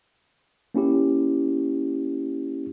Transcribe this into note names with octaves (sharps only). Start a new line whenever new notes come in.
A#3 C#4 E4 G4